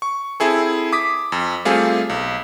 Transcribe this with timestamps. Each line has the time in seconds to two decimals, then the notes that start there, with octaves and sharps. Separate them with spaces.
0.02 C#6
0.40 C4 E4 G#4 A4
0.93 D6 D#6 B6
1.32 F2
1.65 G3 A3 C4 F4 G#4
2.09 B1